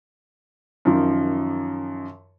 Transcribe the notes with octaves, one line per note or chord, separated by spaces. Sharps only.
F#2 D#3 F3